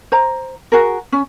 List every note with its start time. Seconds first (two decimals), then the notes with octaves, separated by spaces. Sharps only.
0.12 C5 A#5
0.72 F#4 G#4 A#4
1.12 C#4